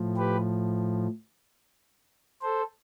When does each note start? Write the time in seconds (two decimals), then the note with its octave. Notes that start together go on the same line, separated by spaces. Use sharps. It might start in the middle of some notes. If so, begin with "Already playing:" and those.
Already playing: A2 F3
0.17 G4 B4
2.42 A4 C5